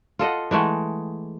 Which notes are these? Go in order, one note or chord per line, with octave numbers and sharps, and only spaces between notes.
F4 A4 D#5 F#5
E3 G#3 A3 F#5